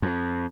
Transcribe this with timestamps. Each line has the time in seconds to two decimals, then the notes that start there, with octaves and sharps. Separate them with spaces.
0.02 F2